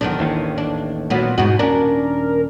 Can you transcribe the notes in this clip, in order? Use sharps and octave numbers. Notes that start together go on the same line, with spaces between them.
B1 E2 D#3 D4
A1 D#2 A2
D4
A#2 F#3 B3
E2 G#2 B2 G#3 F#4
D#1 C#4 D4 A#4